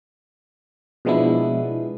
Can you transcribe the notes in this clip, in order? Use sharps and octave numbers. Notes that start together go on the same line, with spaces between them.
B2 F3 G#3 B3 D4 E4